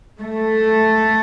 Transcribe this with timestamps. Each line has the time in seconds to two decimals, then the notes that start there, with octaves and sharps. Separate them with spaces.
0.22 A3